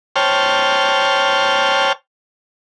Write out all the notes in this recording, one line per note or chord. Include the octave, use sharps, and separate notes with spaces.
C5 C#5 G5 A5 F6